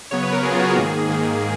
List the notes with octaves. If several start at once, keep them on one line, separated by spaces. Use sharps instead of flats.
C#3 F#3 B3 C#5
B4
A#4
C#3 F#3 B3 G#4
F4
F#4
G#4
G#2 D#3 A#3
G#2 D#3 A#3